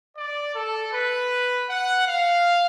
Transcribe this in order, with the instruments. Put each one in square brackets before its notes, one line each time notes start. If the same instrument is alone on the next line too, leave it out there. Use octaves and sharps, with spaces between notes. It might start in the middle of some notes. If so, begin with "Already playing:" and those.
[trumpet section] D5
A4
B4
F#5
F5